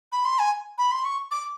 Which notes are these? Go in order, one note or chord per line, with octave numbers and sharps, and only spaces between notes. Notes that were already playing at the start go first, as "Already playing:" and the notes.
B5
C6
G#5
B5
C6
C#6
D6